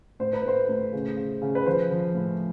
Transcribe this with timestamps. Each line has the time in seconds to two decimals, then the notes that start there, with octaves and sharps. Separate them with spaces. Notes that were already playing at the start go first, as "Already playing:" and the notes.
0.20 A2 C5
0.33 B4
0.45 A2 C5
0.69 A2
0.93 C#3
1.17 C#3
1.42 C#3
1.55 B4
1.66 F3 C5
1.91 F3
2.15 A2